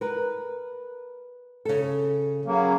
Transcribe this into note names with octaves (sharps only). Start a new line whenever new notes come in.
A#4 B4
C#3 A4
C#3 F#3 A#3